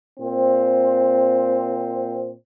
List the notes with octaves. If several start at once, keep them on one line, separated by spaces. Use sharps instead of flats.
A#2 C4